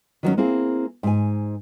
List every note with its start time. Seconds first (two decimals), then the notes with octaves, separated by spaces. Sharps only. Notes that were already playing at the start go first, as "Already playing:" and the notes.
0.23 D#3 F#3 A#3 C#4
0.37 A#3 C4 E4 G#4
1.03 G#2 G#5